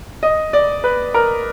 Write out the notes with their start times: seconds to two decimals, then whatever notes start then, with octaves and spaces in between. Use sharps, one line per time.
0.23 D#5
0.53 D5
0.84 B4
1.14 A#4